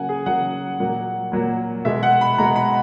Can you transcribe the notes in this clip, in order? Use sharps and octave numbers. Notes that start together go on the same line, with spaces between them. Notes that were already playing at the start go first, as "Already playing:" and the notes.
Already playing: C#3 F#3 A#3 F#5 G#5
G#4
C#3 F#3 A#3 F#5
A#2 F#3 A#3
A#2 F#3 A#3
B2 G#3 E5
F#5
B5
B2 G#3 A#5
B5